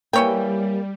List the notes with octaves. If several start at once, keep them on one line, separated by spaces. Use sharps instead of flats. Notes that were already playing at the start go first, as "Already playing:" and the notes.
E3 G3 A#3 C#5 G5